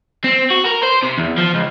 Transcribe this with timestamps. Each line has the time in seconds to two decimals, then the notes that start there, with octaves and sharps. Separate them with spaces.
0.24 C4
0.51 F#4
0.66 A#4
0.83 C5
1.03 C3
1.18 E2
1.37 F3
1.54 C#2